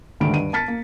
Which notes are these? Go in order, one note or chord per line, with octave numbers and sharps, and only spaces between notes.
D2 G#2 D3 D#3 B5 D7
G2 D#7
A5 F6 A6 B6 C#7
A#3